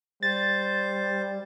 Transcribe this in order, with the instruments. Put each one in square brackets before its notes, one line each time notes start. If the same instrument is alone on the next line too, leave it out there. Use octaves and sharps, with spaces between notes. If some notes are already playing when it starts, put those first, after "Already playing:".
[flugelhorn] G3 [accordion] C5 [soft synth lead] A6